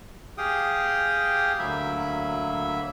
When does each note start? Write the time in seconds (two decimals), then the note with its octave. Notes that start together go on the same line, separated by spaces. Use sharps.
0.38 G4 G#4 F5 G5 D#6
1.59 D2 F#3 A#3 E5 B5